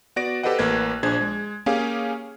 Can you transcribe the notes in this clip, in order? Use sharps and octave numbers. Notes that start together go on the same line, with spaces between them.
B3 F#4 D5 A#6 D7
G4 A4 B4 C5 D#5 F#5
A1 A#3 B4 F#6 G#6
A#1 D4 G#4 C5 G#6
G#3
A#3 C#4 G4 G#4 F5